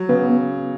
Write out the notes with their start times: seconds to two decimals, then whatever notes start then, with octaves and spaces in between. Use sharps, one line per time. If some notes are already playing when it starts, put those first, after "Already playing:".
Already playing: F#3
0.09 C#3 B3